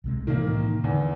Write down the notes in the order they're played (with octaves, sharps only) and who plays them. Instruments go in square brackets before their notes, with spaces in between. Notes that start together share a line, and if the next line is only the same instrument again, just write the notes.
[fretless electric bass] C2 C3 G#3
[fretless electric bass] A2 C3 E3 [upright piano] D#3 A#3
[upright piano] E2 [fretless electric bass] D3